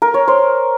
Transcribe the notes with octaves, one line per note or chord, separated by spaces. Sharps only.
A#4
C#5
C5